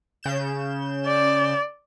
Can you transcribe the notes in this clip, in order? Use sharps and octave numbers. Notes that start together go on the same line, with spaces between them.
C#3 G6 E7
D5